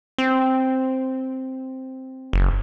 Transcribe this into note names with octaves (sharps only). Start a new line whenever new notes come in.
C4
F#1